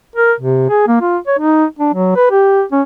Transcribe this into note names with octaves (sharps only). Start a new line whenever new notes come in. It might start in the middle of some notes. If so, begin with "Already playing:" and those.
A#4
C3
G#4
A#3
F4
C#5
D#4
D4
F#3
B4
G4
C#4